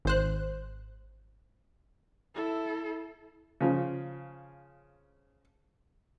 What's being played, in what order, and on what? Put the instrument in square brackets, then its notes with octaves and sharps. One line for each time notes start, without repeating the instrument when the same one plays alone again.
[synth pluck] G#1 C5 F#6
[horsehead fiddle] E4 A4
[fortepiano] C#3 F3